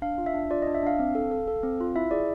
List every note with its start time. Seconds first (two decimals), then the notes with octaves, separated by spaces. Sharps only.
0.02 D4 F5
0.18 F4
0.26 E5
0.34 D4
0.51 F4 D5
0.62 D4 D#5
0.75 E5
0.83 D4 F5
0.99 C4
1.15 A4
1.31 A4
1.48 A4
1.63 C4
1.80 F4
1.96 E4 E5
2.11 G#4 D5